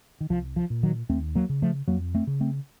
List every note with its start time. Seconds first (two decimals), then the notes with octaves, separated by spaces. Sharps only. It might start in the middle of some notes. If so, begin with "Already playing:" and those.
0.21 D#3
0.30 C2 F3
0.56 F3
0.70 A#2
0.83 D#3 F#3
1.09 D#2 A3 C4
1.35 F#3 A#3
1.49 C#3
1.62 F3 A3
1.88 F2 F#3 A#3
2.15 A3 C4
2.27 C#3
2.41 A3 C4